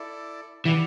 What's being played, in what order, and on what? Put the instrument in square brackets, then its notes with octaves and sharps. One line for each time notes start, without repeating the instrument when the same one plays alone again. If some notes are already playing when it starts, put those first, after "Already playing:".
Already playing: [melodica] E4 A4 D5
[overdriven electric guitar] E3 [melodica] E4 G4 D5 F#5